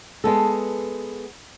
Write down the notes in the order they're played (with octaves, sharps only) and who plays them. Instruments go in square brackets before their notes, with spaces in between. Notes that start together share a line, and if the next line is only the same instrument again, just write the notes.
[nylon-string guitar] G#3 B3 A4